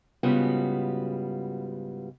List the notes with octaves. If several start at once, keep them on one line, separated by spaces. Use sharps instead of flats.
G#2 C#3 G3 B3 F4 F#4